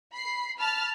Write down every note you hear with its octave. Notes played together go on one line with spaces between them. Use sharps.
B5 C7
A5 B5 F6